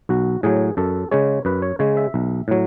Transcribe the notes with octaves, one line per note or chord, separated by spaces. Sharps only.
B1 F#4
A2 F#3 G#4
F#2 A4
C#3 G#3 C#5
F#2 B4
C#5
C#3 G#3 C#5
E5
B1
A2 F#3